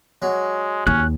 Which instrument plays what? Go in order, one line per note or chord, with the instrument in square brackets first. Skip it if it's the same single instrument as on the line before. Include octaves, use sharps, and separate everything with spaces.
[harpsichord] F#3 [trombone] G#3
[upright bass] D#2 [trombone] C#4 [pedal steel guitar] F#6